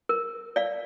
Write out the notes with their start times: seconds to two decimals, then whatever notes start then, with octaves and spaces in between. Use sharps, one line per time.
0.09 A#4
0.56 D5 F5